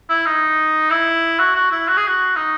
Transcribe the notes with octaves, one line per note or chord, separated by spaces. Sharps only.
E4
D#4
E4
F#4
F#4
E4
F#4
G#4
F#4
D#4